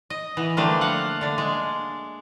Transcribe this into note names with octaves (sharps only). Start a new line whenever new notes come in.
D#5
E3 B3
D3 F3 G3 A3 A#3 D4
F5 F#5
D3 D4
G#3